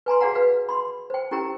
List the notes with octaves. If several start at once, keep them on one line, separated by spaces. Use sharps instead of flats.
B4 G#5 A#5 C6
F#4 G#4 D5 F5 F#5 A#5
B4 F5
B5 C6
C5 G5
C#4 E4 G4 A#4 G5 A#5